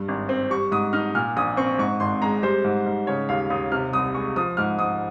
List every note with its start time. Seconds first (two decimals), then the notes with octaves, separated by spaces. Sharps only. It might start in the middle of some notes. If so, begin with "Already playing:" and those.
Already playing: G2
0.08 G#1
0.29 C4
0.50 G3 C#6
0.72 G#2 D#6
0.93 D#4 F6
1.15 A#2 F6
1.36 A#1 D#6
1.57 C4 C#6
1.79 G#2 C#6
2.00 G#1 C6
2.22 G#3 A#5
2.43 G3 C5
2.64 G#2
2.86 G#2
3.07 C#3 C#5
3.29 D#2 F5
3.50 D#2 D#6
3.72 C3 F6
3.93 C2 D#6
4.14 G#3 C#6
4.36 F3 D#6
4.57 G#2 F6
4.79 G#2 D#6